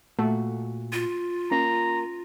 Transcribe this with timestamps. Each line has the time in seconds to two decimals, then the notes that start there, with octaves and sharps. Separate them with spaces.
0.19 A#2 A3 F#4
0.93 F4
1.52 A#3 C#4 A#5